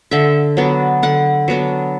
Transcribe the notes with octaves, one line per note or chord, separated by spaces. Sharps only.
D3 E5
F#3 B3 D4
D3 F#5
F#3 B3 D4